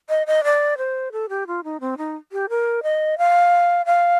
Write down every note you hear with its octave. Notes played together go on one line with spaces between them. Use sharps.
D#5
D#5
D5
C5
A4
G4
F4
D#4
C4
D#4
G4
A#4
D#5
F5
F5